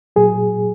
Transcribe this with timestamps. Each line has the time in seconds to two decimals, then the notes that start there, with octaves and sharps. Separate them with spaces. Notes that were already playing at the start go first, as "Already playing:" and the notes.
0.16 A#2 F#3 G#4